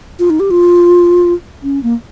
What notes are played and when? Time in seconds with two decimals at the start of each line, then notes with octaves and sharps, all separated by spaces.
0.19 F4
0.30 D#4
0.40 G4
0.51 F4
1.63 C#4
1.83 A#3